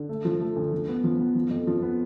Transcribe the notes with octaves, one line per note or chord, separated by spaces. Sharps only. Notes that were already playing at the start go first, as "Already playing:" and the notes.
Already playing: D3
A3
F3
A3
D2
F3
B3
F3
B3
F3
F2
F3
B3